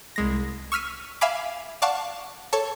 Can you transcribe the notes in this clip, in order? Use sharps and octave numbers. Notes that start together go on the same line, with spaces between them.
C2 G#3 A#6
C#6 E6 F6 B6 D#7
E5 F5 G#5 B5 D6
D5 F5 F#5 A5 C#6
A4 C#5 C#7